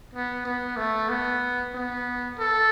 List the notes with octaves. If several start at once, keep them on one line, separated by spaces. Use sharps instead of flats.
B3
B3
A3
B3
B3
A4